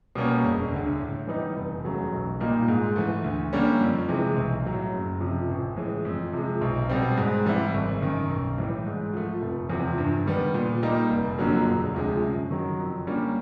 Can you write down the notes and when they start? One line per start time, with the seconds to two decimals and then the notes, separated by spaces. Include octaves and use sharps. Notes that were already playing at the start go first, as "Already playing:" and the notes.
0.15 B2 G3 A#3 C#4
0.44 E1
0.72 D2 D3
1.00 A2
1.27 E3 G3 B3 D#4
1.56 F1
1.84 E2 C#3 F#3 A3
2.12 B1
2.40 A#2 G3 A#3 D#4
2.68 G#2
2.96 E3 A3
3.24 D2
3.53 D3 G3 A#3 C#4
3.80 F2
4.08 C3 E3 G#3
4.36 B1
4.65 A2 F#3
4.93 F#1
5.21 F2 C3 F3
5.49 A1
5.76 A2 E3 G#3
6.05 F2
6.33 C3 F3 G#3
6.61 B1
6.89 B2 G3 C4
7.17 G#2
7.46 E3 G3 C4 E4
7.74 G#1
8.01 F#2 D#3
8.29 B1
8.58 A2 E3 G3
8.86 G#2
9.13 F3 A3
9.42 F1
9.70 E2 C3 F3
9.98 G2
10.26 D#3 G3 B3
10.54 A#2
10.83 G3 A#3 D#4
11.10 F1
11.38 F2 D3 F#3 A#3
11.66 E1
11.94 D2 C3 F3 G#3
12.22 F#2
12.51 D#3 F#3
12.79 F2
13.07 D3 G3 A#3 C#4